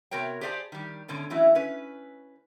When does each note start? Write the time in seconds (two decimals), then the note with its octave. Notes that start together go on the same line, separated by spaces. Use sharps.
0.11 C3 B3 F#4 A#4 C#5 G5
0.41 G4 G#4 C5 D5 E5 A5
0.72 D#3 G3
1.08 G#2 B2 D3 C#4
1.30 E3 F#3 A3 C#4 E4
1.55 C#4 B4